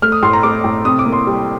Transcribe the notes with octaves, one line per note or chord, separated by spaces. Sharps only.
A3 F6
D#6
A2 C6
A#5
A3 D6
A2
C3 D#6
D6
A#3
C6
G3